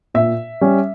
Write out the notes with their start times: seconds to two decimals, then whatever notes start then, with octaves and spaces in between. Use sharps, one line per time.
0.14 A#2 E5
0.61 G3 C#4